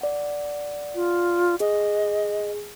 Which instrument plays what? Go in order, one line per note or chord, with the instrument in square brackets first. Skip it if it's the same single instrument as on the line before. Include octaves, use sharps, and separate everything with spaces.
[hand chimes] D5 F#5
[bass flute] F4
[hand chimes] G#4 [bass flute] D#5